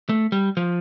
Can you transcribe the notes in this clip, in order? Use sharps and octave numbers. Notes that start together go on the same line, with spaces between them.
A3
G3
F3